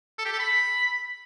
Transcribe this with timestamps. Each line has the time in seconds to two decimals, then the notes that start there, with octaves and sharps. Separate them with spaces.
0.18 A4
0.25 G4
0.32 A4
0.39 B5